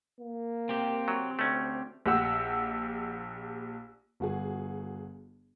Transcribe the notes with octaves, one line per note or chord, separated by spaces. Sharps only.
A#3
C4 G4
F#3
D2 A3 C#4
A#1 G4 F#5 E6
G1 F#4 G#4